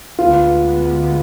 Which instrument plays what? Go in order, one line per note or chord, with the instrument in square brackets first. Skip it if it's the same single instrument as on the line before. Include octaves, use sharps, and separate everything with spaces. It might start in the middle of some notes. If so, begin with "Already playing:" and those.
[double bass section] D2 D3 G#3 B3 [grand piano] F4